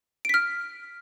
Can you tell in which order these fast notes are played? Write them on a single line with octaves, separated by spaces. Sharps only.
D7 B6 F6